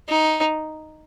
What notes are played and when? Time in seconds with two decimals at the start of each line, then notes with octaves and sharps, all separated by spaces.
0.09 D#4